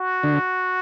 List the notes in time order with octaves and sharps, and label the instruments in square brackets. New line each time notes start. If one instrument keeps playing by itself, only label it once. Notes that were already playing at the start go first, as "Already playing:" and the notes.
Already playing: [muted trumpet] F#4
[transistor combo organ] D3